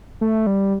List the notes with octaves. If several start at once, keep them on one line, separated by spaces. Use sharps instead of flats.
A3
G3